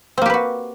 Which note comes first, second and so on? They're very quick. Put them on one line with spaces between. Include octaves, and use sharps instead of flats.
C4 A#3 G4 B4 F#4